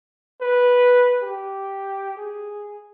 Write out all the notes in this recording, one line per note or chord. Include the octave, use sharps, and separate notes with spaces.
B4
G4
G#4